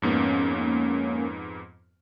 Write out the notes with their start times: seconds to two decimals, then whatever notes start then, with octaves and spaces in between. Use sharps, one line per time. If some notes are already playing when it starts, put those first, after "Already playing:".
0.02 F2 G#2 A#3 B3 C#4